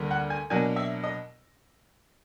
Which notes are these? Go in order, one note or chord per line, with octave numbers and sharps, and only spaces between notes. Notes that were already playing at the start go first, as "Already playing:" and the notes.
Already playing: D2 D3 G3 A#3
F#5
G#5
B2 F#3 A#3 D4 G#5
E5
D#5